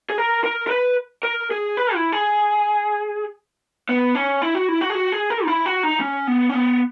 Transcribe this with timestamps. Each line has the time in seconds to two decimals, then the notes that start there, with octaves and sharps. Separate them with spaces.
0.10 G#4
0.18 A#4
0.44 A#4
0.67 A#4
0.71 B4
1.23 A#4
1.51 G#4
1.77 B4
1.94 E4
2.12 G#4
3.89 B3
4.15 C#4
4.42 E4
4.55 F#4
4.68 E4
4.81 F#4
4.90 G#4
4.95 F#4
5.12 G#4
5.30 A#4
5.44 D#4
5.47 E4
5.66 F#4
5.83 D#4
6.00 C#4
6.27 B3
6.49 C#4
6.54 B3